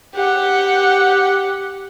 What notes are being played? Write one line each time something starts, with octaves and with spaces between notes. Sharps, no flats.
G4 F#5